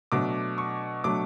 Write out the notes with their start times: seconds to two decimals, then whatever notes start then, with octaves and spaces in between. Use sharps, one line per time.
0.12 B2 F#3 A3 D4 D6
0.58 C#6
1.04 B2 F#3 A3 D4 D6